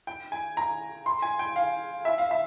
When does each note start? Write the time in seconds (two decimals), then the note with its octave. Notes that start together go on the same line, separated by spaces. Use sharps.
0.07 G5
0.32 G#5
0.57 A#5
1.06 C6
1.22 G#5
1.39 G5
1.56 F5
2.05 E5
2.18 F5
2.31 E5